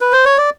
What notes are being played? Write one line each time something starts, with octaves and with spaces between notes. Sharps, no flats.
B4
C5
C#5
D5